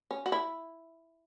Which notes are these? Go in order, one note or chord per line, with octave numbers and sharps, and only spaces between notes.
C#4
F#4
E4